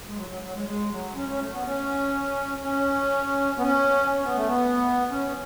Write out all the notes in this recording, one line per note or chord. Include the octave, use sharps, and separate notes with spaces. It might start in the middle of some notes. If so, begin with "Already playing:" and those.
G#3
F#3
F#3
F#3
G#3
G#3
F#3
C#4
C#4
A3
B3
C#4
C#4
B3
C#4
C#4
B3
A3
B3
C#4